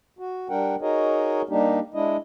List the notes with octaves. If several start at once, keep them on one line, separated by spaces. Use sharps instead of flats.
F#4
G3 D4 A#4 F#5 G5
D#4 F#4 G#4 A#4 C#5 D#5
G3 A#3 D4 D#4 G4
G#3 D4 E4 D#5